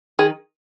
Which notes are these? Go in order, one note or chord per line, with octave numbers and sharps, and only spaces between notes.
D#3 G#4